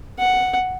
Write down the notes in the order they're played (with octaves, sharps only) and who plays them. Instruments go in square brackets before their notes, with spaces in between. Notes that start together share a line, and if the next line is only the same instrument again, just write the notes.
[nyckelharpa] F#5